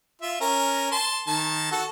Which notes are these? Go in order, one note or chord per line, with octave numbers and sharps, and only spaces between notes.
F4 E5
C#4 A#4
A5 C6
D#3 A5
F#4 A4